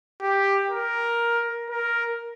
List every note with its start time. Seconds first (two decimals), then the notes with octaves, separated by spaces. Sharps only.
0.22 G4
0.70 A#4
1.70 A#4